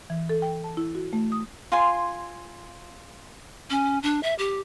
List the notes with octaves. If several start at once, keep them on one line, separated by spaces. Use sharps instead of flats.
E3
A4
G5
A5
E4
F#4
A3
D#6
F4 G#5 C6
C#4
D4
E5
G4